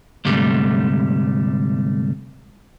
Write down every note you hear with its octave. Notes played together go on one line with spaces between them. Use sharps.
D2 G#2 C3 G3 A3